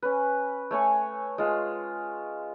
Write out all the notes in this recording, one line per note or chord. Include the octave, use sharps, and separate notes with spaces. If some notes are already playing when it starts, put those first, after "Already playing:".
C#4 B4
A3 C#5 G#5 C#6
G#3 F4